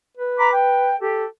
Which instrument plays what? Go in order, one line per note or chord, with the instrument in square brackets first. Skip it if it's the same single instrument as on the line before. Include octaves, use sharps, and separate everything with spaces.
[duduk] B4
[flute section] A#5 B5 D6
G5
[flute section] G4 [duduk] A4